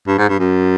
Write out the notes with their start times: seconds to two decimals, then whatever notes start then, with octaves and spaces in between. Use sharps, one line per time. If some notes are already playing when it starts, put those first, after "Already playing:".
0.08 G2
0.18 G#2
0.29 G2
0.40 F#2